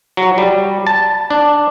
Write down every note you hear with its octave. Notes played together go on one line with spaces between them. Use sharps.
F#3
G3
A5
D4